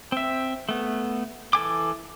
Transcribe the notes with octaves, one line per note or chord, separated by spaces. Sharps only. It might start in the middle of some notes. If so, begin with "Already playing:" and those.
C4 E5
A3 B3
E3 A4 G#5 D6